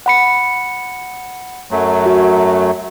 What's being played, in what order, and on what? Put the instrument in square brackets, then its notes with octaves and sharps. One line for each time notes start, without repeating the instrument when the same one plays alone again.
[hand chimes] F#5 B5 C#7
[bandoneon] F#2 F#3 A3
[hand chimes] F#4